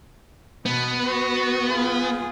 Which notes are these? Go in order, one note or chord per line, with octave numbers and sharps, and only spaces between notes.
B2 B3
F#4
F4 G#4